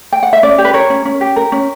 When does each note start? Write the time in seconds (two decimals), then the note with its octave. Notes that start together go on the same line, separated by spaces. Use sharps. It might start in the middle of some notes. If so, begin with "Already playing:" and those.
0.12 G5
0.23 F#5
0.33 E5
0.43 C#4 D5
0.58 G4
0.65 B4
0.74 A#4 C#5
0.90 C#4
1.05 C#4
1.21 G4
1.36 A#4
1.52 C#4